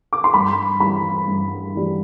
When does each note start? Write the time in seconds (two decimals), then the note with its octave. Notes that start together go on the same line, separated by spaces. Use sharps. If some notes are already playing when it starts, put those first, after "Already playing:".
0.13 D6
0.24 C6
0.34 G2 B5
0.80 E3 G3 B5
1.27 G2
1.74 E3 G3